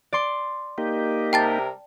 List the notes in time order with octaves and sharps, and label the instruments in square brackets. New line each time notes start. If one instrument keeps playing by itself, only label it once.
[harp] D5 C6
[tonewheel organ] A#3 D#4 G4
[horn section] C3 G3 A#4 [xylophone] G5 A5 A6